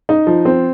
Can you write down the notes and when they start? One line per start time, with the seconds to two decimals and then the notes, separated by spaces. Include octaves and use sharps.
0.09 D#4
0.27 F3
0.45 C4